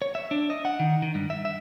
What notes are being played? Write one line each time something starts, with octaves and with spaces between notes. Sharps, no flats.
C#5
E5
D4
D#5
F#5
D#3
D#3
G2
E5
E5